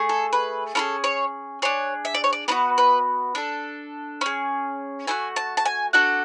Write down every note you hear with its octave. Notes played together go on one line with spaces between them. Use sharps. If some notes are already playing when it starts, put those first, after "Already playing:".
Already playing: A3 G#4
A4
B4
C#4 E4 G#4 A4
C#5
D4 G#4 C#5
E5
D5
C#5
D5
B3 D4 F#4 B4
B4
D4 A4
C#4 G#4
A3 D4 F#4 G#5
A5
A5
G#5
D4 F#4 A4 F#5